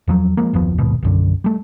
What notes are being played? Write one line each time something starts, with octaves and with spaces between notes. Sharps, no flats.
E2 F3 F#3
F3 G#3 A#3
F#1 D#2 F3 B3
A#1 D#2 G#2 B2
B1 F#2 D3
G3 A3